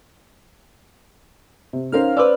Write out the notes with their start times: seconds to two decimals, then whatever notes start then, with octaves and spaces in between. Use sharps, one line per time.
1.73 C3
1.92 C#4 D#4 A#4 C5 F5 F6
2.17 B4 C5 D5 D6 E6